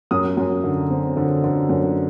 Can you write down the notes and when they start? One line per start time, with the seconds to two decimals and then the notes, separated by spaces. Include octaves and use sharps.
0.11 F#2 D#6
0.37 F#2
0.64 D3
0.91 C4
1.17 D3
1.44 D3
1.69 F#2